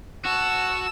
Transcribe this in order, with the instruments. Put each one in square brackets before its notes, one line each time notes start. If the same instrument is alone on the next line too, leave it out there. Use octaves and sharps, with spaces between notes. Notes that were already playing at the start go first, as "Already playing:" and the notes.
[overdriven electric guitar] F#4 [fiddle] A5 E6